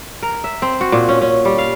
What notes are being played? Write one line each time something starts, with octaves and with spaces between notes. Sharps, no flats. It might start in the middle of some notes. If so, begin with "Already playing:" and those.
A#4
E5
C4
F#4
A#2
C#4
C#4
G3
F5